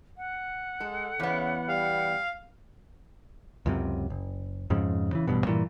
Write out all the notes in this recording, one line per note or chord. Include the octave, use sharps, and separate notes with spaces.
F#5
G#3 A4
E2 C#3 B3
G3 F5
C#2 F#2 C3
F#1
F2 G#2 C#3
C#3 E3
A1 G2 B2
G2 A#2 E3